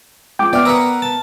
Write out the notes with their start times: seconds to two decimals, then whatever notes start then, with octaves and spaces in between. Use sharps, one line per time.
0.39 F3 G#3 G5 D6
0.53 B3 D5 E5 G5 F6
0.65 A#4 B4 F#5 A#5 D#6 E6
1.02 A5